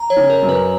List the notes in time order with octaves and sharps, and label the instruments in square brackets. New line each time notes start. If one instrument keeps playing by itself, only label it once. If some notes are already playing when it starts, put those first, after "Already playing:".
Already playing: [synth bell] A#5
C#5
[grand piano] C#3
[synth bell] A#4
[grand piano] F#2
[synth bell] B4